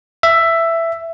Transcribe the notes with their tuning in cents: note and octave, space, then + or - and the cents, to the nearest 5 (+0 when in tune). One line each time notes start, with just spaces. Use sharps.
E5 +10